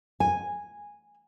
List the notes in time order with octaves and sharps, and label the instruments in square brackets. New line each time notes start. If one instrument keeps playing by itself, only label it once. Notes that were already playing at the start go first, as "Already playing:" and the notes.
[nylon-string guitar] G#5